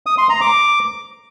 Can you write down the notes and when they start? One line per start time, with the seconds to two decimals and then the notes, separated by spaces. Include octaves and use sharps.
0.06 D#6
0.18 C6
0.30 A#5
0.41 D6